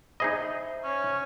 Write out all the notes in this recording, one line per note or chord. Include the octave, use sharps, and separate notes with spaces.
D#4 G#4 C5 D#5 E5 B5
C#4 C#5